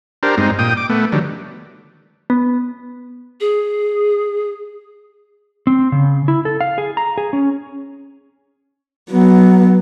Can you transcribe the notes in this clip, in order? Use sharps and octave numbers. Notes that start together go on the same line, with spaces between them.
D4 G4 A#4 C5
G2 G#3 C4 D#4
A#2 G5 D#6
D6
A3 B3
D3 D#3 F#3 G3
B3
G#4
C4
C#3
E4
A4
F5
G#4
A#5
G#4
C#4
F#3 B3